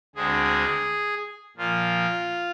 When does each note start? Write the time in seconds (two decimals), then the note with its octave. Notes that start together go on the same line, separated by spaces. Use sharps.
0.16 D2 D3 G#3 C4 G#4
1.57 A#2 F3 A#3 F4